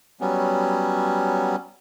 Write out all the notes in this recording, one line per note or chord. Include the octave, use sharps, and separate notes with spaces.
F#3 G3 B3 C#4